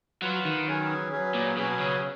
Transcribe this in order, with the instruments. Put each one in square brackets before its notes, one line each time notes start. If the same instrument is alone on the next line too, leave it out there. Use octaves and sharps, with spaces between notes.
[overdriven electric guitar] F#3 [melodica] F4 B4 F#5
[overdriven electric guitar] D#3
[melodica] F#3 C#4 G#4 B4
F#3 C#4 G#4 B4
[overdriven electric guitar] A#2
[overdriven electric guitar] B2 [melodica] F#3 C#4 G#4 B4
[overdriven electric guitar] C#3